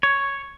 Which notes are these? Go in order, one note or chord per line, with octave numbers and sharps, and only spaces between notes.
C#5